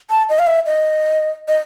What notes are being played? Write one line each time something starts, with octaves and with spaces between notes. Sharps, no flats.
A5
D#5
F5
E5
D#5
D#5